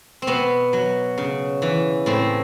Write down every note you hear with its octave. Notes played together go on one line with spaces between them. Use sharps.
C4
B2 B3
F#3
C#3
E3
A2 C4